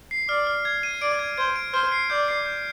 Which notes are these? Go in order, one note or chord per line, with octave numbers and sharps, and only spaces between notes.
C7
D5 F6
F6
G#6
D#7
D5 D7
G#6
C5 G#6
D7
C5 F6
C7
D5 G6
C7
G6